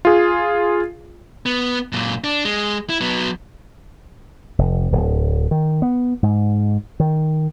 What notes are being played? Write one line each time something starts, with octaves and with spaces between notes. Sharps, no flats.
F4 G#4
B3
F#2 A#2
D4
G#3
E4
F#3 B3
F1
D1
D#3
B3
G#2
D#3